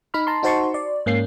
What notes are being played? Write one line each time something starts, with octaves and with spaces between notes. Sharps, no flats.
D#4 B5 F6
A5 A#5 C6
D#4 F#4 C5 A5 C6 C#6
D5
G#2 A#3 C#4 C7